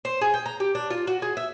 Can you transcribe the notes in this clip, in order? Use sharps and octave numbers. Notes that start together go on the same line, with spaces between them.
C5
G#4
G5
A#5
G4
D4
F4
F#4
G#4
E5